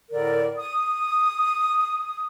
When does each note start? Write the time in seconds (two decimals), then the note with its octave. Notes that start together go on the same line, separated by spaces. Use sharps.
0.12 A2 D3 A#4 D5
0.57 D#6